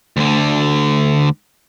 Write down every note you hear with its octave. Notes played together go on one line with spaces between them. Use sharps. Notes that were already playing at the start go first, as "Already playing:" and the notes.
D2 D3